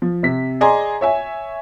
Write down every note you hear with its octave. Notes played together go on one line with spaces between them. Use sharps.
F3
C3 B6
G#4 D5 D#5 G#5 A#5 C6
C#5 E5 G#5